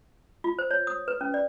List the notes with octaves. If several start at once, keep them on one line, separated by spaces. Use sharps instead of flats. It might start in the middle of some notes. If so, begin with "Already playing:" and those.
F4
C5
C#5
D#6
B4
C#4
D5